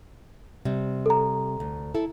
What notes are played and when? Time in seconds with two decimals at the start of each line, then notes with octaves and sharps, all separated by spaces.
0.65 C3 G3
1.06 A4 A#5
1.60 D2
1.95 E4 A4